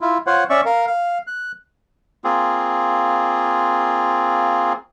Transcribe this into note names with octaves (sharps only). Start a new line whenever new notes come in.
E4 F4
F4 C5 C#5 F#5
C#4 D5 E5 C#6
A#4 F5
F5
F#6
A#3 C4 F4 G#4